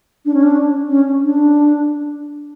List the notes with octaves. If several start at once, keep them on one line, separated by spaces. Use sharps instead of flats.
D4
C#4
D4
C#4
D4